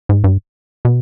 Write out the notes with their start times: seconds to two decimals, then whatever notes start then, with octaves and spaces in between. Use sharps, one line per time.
0.09 G#2
0.24 G2
0.85 B2